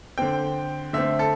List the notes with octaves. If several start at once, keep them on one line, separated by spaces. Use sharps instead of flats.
D3 C4 G5
D3 A3 C4 E5
A4